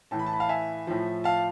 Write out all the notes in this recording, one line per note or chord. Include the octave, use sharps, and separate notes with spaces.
A2 E3 A5
B5
A5
B5
F5 A5
E5 G#5
A2 F3
F5 A5